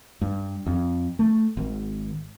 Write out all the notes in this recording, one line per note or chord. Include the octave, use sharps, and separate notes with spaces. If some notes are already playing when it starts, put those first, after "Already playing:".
G2
F2
A3
G#1